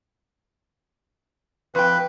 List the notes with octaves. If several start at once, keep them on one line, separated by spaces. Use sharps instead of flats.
F2 B4 G5